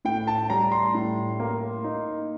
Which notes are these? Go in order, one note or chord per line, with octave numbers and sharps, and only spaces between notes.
A2 G5
A5
G3 A#5
C6
A2
A#3
D#4